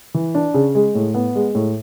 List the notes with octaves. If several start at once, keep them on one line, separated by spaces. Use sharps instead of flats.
E3
D4
C#3
G#3
A2
B3
G#3
A2